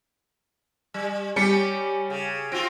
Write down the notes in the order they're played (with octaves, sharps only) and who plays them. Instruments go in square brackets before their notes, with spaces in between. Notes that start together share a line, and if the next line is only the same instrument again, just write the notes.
[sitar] G3
[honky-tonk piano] G3 B6 C#7 [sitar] C#4 G4
[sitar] C#3
[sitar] C4 F4 F#4 [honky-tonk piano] D7